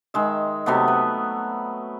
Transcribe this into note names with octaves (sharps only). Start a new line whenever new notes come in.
D#3 G#3 E5
C3 F#3 A3 B3
B4